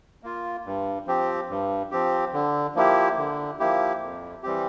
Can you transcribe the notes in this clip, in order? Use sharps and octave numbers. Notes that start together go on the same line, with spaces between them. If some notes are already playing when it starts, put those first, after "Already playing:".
A#3 F4
G2
F3 C4 G4
G2
F3 C4 G4
D3
F3 A#3 E4 G4
D3
F3 A#3 E4 G4
F2
E3 G3 C4 G4